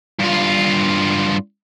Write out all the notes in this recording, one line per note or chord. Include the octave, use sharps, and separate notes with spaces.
G2 F4